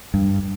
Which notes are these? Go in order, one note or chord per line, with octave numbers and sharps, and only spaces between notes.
G2